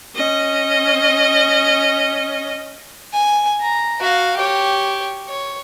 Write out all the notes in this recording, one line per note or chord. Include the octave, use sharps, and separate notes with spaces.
C#4 D#5
G#5
A#5
F#4 F5
G4 C#5
C#5